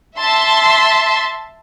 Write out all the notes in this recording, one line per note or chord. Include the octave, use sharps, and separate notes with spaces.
E5 A5 C6